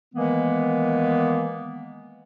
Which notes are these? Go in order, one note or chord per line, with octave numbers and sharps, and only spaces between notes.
D#3 E3 G#3 A#3 B3